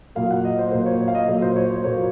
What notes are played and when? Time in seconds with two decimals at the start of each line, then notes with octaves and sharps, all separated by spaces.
0.15 A#2 F#3 A#3 F5
0.31 F#5
0.45 D#5
0.59 C5
0.71 A#2 F#3 A#3 C5
0.86 C#5
1.01 C#5
1.08 F5
1.15 D#5
1.28 A#2 F#3 A#3 D#5
1.42 C5
1.56 C#5
1.70 C5
1.84 A#2 F#3 A#3 C#5